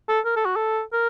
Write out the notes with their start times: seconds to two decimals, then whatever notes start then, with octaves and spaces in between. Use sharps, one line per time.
0.09 A4
0.25 A#4
0.36 A4
0.46 F#4
0.56 A4
0.93 A#4